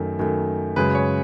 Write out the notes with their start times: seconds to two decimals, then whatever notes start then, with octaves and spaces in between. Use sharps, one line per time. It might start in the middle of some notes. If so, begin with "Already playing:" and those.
Already playing: F#2 D#3 A3
0.19 F#2 D#3 A3
0.76 F#2 C#3 G#3 B4
0.95 C#5